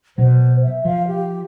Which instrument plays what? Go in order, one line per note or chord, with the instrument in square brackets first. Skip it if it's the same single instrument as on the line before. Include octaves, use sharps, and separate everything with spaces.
[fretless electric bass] B2 F#3 [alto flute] C5
[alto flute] E5
[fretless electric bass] F3 [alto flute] F5
[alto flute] G4